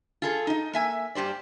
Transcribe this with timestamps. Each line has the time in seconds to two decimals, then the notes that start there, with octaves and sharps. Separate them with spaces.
0.22 F4 G#4 A4
0.47 D#4 D#5
0.73 A#3 E5 G#5
1.15 G2 G4 C5 D5